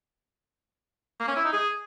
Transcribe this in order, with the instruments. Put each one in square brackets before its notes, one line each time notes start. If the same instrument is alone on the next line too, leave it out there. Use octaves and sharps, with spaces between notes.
[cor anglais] A#3
C#4
E4
D#4
G#4